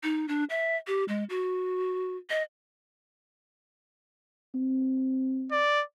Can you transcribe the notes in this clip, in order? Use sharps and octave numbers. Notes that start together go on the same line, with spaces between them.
D#4
D4
E5
G4
G#3
F#4
D#5
C4
D5